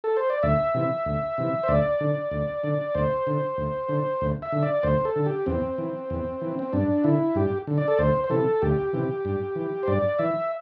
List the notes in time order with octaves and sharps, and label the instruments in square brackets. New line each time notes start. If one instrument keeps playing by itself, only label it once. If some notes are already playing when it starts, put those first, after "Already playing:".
[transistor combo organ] A4
C5
D5
D2 E5
C3 E3
D2
C3 E3
C5
D2 D5
D3
D2
D3
D2 C5
D3
D2
D3
D2
E5
D3
D5
D2 C5
A4
D3
G4
E2 C4
E3
E2
E3
C4
G2 D4
D3 E4
G2 G4
D3
D5
A4
D2 C5
C5
C3 E3 A4
D2 G4
C3 E3
G2
E3
C5
G2 D5
E3 E5